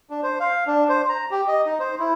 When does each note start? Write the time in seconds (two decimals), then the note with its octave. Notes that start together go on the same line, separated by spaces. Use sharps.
0.10 D4
0.23 C5
0.40 F5
0.67 D4
0.89 C5
1.09 A#5
1.31 G4
1.48 D#5
1.66 D#4
1.80 C5
1.99 E4